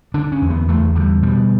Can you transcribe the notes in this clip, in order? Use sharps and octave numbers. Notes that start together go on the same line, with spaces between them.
D3 D4
C#4
E2
B3
E2 A3
D3 G3
B2 G3